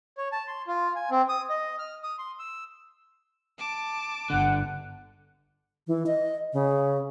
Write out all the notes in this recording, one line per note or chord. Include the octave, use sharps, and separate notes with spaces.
C#5
A5
C6
F4
G#5
C4
D#6
D#5
F6
D#6
C6
E6
A5 D6
G1 D3 F#5 F#6
E3
D#5
C#3